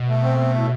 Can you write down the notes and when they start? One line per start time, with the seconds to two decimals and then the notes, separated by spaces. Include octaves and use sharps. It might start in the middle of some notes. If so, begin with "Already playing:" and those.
Already playing: B2
0.08 A3
0.23 C4
0.39 A3
0.55 A2